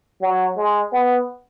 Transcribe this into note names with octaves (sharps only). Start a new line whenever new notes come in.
F#3
G#3
B3